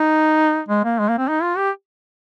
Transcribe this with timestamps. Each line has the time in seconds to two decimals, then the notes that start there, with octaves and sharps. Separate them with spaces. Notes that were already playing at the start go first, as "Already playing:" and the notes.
Already playing: D#4
0.69 G#3
0.85 A#3
0.99 G#3
1.09 A#3
1.18 C4
1.28 D#4
1.43 F4
1.57 G4